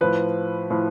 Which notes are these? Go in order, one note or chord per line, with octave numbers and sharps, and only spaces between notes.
A2 F3 B4
A2 F3